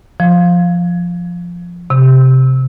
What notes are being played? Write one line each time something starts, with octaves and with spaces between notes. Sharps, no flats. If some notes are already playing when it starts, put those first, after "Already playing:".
F3
C3